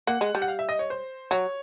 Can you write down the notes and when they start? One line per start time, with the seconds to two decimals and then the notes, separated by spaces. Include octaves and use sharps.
0.07 A#3 F#5
0.21 G#3
0.35 G3
0.42 F#5
0.48 F5
0.59 E5
0.69 D#5
0.79 C#5
0.90 C5
1.31 F#3 C#5